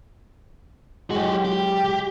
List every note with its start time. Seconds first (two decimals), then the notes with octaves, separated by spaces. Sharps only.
1.11 F#3 G#3 F#4 G4
1.45 G4